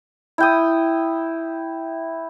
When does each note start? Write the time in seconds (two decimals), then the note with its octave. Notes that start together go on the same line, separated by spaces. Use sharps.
0.38 E4 G5 D#6